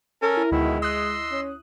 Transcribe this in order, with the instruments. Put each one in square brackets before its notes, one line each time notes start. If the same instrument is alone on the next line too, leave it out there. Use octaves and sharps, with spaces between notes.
[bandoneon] C#4 A4 G#5 [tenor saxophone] A#4
[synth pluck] E4
[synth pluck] D2 [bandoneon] B2 D#3 E4 [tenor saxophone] G#3
[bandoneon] D#5 C6 E6 [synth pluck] D#6 F#6
[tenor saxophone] C#4